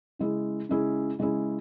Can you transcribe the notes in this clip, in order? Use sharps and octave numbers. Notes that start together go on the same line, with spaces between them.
C#3 G#3 C#4 E4 G#4
C#3 G#3 C#4 E4 G#4
C#3 G#3 C#4 E4 G#4